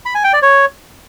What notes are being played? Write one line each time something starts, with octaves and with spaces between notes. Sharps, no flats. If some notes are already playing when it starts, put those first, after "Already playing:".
B5
G#5
G5
D5
C#5